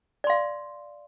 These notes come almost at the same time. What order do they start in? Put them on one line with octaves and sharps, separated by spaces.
D5 C6 F5